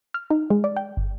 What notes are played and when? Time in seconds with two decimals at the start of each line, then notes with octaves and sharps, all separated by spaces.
0.14 F6
0.30 D#4
0.50 G#3
0.64 D5
0.77 G5
0.97 G1